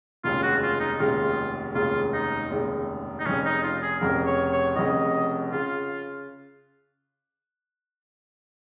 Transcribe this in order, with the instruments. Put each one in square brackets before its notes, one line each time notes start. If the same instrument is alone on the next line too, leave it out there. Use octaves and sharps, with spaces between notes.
[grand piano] F1 D#2 C#3 G#3 [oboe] F4
[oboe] F#4
F4
D#4
[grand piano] F1 D#2 C#3 G#3 [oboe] F4
[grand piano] F1 D#2 C#3 G#3 [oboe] F4
[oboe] D#4
[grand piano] F1 D#2 C#3 G#3
[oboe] D#4
[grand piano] F1 F2 C#3 [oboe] C#4
[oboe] D#4
F4
G#4
[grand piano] F1 F2 C#3 [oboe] A#4
[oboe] C#5
C#5
[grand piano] F1 F2 C#3 [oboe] D#5
[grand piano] C#3 [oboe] F4